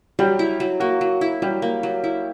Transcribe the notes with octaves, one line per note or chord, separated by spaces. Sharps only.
F#3 G3 G4
E4
F#3
A#3 F#4
F#3
E4
F#3 G3 G4
A#3
F#3
E4